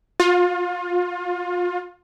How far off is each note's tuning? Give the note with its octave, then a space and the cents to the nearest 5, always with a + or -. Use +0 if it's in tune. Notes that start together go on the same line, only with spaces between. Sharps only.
F4 +30